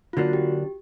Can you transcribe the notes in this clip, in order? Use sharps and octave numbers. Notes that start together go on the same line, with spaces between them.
F4
D3 F#3 A#3 D4 F#4
G4